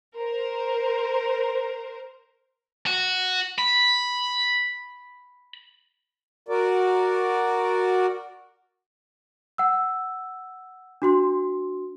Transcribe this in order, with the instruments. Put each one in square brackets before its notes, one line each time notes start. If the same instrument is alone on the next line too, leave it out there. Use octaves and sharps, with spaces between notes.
[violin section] A#4 C5
[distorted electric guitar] F#4
B5
[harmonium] F#4 A#4 D5
[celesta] F#5 E6
D4 F#4 C6